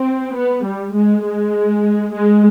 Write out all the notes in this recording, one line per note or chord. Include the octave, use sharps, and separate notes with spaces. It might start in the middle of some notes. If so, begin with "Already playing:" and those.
Already playing: C4
B3
G3
G#3
G#3
G#3